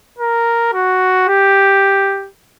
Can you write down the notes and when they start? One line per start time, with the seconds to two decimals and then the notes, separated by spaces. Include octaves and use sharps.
0.19 A#4
0.74 F#4
1.29 G4